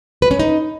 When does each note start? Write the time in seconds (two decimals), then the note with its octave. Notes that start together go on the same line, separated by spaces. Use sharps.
0.22 B4
0.31 C#4
0.39 D#4